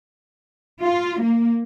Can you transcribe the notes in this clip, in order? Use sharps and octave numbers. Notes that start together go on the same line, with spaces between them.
F4
A#3